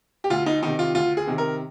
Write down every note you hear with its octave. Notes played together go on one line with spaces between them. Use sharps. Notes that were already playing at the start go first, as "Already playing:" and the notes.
G4
D2 F4
D#4
C3 D#3 D#4
F4
D2 F4
G#4
C3 D#3
A#4